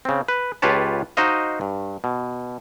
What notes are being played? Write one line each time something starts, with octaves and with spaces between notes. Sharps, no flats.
C#3 C4
B4
C#2 F4 G4 B4 C#5 A5
D#4 F#4 C5 D#5 F5
G2
B2